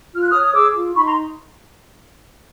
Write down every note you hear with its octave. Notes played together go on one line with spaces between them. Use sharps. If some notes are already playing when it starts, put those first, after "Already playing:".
F4 F6
F#6
D#6 F6
C#5
D#6
G#4 D6 E6
F4
D#4 B5 C#6
A#5 C6